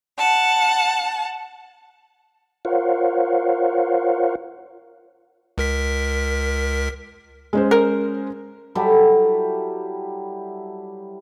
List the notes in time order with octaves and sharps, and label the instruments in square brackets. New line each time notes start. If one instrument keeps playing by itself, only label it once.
[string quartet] F#5 A5
[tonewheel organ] F4 A#4 C5 C#5 F5 F#5
[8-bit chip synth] C#2 A#4 B6
[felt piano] G#3 C#4 C5
[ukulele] A#4
[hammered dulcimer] F#3 G3 E4 A4